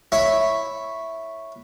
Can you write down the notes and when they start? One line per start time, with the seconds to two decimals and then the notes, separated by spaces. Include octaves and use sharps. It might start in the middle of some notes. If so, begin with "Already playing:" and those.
0.12 E4 C#5